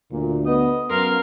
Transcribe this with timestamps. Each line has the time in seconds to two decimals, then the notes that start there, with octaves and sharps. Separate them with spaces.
0.11 D2 A#2
0.46 B3 D#5
0.90 F#2 B3 A#4 F5 C6